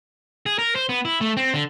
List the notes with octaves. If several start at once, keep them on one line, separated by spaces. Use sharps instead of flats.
G#4
A#4
C5
B3
E4
A3
C4
D3